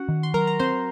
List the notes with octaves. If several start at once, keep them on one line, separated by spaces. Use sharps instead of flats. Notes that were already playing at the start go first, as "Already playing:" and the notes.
Already playing: C#4 F#4 F#5
D#3
C6
F#3 A#4 A#5
A#5
C4 C5 C6